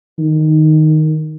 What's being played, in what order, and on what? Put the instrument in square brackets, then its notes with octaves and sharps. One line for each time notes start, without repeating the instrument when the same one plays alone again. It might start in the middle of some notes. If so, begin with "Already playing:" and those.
[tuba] D#3